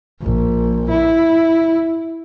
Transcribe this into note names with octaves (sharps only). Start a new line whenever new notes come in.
A#1
E4